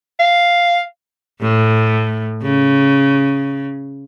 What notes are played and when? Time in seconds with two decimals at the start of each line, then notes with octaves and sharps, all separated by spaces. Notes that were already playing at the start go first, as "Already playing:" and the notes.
0.20 F5
1.41 A2
2.43 C#3